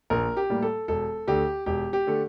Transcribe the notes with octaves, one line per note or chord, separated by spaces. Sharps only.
A#1 A#4
G4
A2 G3 A#3
A4
E1 A4
D2 D3 A3 G4
E1 G4
G4
D3 A3